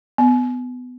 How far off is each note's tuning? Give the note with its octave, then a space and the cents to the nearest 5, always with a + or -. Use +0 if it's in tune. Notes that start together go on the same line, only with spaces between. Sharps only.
B3 +20